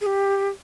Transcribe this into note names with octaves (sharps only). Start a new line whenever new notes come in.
G#4
G4